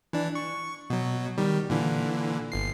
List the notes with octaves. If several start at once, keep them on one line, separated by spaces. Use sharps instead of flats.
E3 D4
C#6
B2 F#3
D#3 G3
A#2 D3 E3
G1 C7